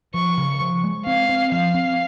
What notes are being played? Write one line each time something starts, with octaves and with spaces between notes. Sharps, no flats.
F3 C#6
C#3
F3
G#3
C4 F5
C4
F3 F5
C4